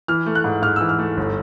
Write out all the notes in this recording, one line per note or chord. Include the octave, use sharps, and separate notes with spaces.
E3 F6
A3
F#6
G#2
G#2 F6
E3 E6
F6
A3
G1